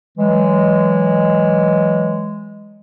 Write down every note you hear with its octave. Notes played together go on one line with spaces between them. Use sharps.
E3 F#3 G#3